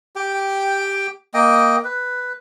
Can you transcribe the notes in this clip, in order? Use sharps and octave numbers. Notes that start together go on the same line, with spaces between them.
G4 G5
A#3 D#5 G5
B4